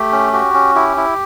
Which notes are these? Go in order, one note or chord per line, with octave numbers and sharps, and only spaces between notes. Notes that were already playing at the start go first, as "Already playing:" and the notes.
Already playing: A3 G4
C#4
F#4 G4
C#4
E4 G4
E4